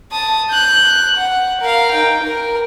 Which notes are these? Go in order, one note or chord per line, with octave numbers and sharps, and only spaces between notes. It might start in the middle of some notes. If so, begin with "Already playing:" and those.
A5 D#6
F#6 G6
F#5
A#4 F5
D#4 G5
A#4